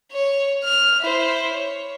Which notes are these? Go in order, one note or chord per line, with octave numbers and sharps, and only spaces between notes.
C#5
F6
E4 C5
C#5